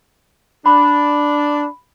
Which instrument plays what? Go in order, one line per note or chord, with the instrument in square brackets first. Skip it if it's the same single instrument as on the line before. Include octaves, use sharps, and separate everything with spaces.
[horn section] D4 [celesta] B5